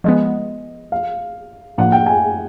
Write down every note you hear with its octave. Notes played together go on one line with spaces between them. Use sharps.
F3 G#3 B3 D#5
F5
A2 F3 A#3 D4 F4 F#5
G5
G#5